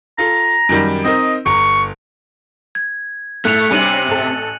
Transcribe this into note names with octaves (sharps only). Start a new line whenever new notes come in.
F4 A4 A#5
F#2 D#3 G3
C4 D#4 A#4 D#5
G1 A#5 C#6
G#6
A2 A3 F#6 C#7 F7
C3 G3 C#4 D4 G#5 D#7 F#7
A1 A4